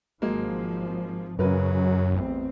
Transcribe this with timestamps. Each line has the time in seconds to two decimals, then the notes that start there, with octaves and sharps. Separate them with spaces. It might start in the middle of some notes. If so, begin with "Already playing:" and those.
0.22 G#1 F3 F#3 G#3 A#3
1.39 F#2 C#3 F#3 A#4 B4
2.11 A1 E2 C4